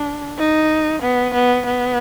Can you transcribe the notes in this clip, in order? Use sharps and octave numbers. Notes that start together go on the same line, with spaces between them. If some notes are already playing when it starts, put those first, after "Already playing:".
Already playing: D4
D#4
B3
B3
B3